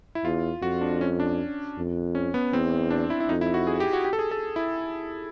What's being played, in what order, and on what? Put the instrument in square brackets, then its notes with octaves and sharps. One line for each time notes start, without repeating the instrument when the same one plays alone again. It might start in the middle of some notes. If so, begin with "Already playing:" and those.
[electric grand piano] E4
[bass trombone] E2 [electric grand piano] F4
[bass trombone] F2 [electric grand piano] F#4
[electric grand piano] D4
C#4
D4
[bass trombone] F2
[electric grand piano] C#4
B3
[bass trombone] E2 [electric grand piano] C4
[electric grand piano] D4
E4
E4
[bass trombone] F2 [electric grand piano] D#4
[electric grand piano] E4
F#4
G#4
G4
F#4
G4
A4
G#4
A4
E4